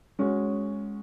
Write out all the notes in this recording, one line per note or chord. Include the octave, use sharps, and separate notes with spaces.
G#3 C#4 F#4